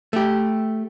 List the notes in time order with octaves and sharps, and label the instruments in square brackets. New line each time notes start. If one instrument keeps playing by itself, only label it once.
[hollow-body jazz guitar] A3 G4